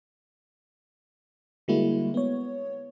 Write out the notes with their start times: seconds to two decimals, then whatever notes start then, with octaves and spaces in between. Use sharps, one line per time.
1.68 D3 G3 G#3 A#3 E4 F#4
2.14 B3 C#5